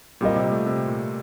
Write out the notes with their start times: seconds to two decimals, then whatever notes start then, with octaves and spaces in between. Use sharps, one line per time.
0.21 A#2 G3 C4 F4 A#4 D#5
0.36 C3
0.51 A3
0.66 C3
0.87 A#2